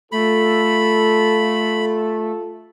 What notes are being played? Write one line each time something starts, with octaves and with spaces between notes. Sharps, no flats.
A3 F4 A4 B5